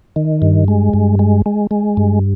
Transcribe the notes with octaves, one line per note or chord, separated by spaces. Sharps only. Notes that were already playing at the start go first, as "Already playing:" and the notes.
D#3
G2
G#3
G2
G#3
G#3
G#3
G2